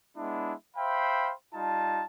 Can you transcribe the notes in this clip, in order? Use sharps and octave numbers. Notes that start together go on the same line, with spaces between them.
G#3 B3 D4 E4
C5 E5 F5 G5 B5
G3 D#4 F4 A5